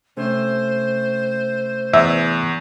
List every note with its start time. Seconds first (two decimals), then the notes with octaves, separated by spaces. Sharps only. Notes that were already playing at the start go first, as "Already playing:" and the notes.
0.17 C3 A3 C#4 C5
1.94 E2 E5